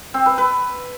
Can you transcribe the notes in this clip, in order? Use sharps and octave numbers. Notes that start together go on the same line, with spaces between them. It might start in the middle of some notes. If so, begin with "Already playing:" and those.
C4
B4
B4